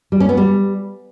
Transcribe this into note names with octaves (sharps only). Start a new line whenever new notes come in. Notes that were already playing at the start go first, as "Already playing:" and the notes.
G3
C#4
B3
G3